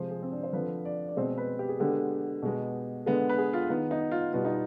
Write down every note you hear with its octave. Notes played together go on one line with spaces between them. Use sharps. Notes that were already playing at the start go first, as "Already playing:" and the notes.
Already playing: C3 F3 G#3 C5
G#4
C4
D4
C5
D3 F3 C4 B4
D5
D5
B2 G#3 C4 C5
B4
G4
G#4
D3 G#3 B3 G4
B2 G#3 B3
D3 G#3 B3
B4
G#4
F4
D#3 B3
D#4
F4
B2 G3 B3 F4
D#4